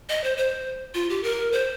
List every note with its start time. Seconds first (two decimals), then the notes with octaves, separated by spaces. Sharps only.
0.09 D#5
0.24 C5
0.38 C5
0.94 F4
1.10 G4
1.24 A#4
1.52 C5